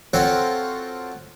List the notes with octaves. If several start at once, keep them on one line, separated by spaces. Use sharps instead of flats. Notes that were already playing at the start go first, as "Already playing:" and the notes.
C4 F4 F#4 A4 C5 C#5